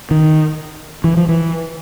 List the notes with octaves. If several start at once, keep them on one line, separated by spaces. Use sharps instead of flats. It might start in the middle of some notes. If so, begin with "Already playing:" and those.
D#3
E3
F3
E3